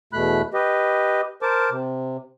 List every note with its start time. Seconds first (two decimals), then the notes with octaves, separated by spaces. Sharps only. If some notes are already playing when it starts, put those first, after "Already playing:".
0.13 E2 B2 A3 B5 F#6
0.54 G4 B4 D#5
1.42 A#4 C5 A5 D6
1.71 C3